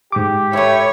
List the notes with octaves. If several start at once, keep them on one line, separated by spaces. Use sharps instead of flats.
G#2 G4 D6
A3 E4 C#5